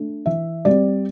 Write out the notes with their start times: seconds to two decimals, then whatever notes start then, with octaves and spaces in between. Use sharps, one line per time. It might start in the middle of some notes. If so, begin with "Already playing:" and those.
Already playing: A3 D4
0.26 E3 E5
0.65 G3 C4 D5